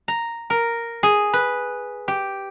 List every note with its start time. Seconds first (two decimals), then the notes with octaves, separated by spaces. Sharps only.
0.08 A#5
0.50 A#4
1.03 G#4
1.33 B4
2.08 G4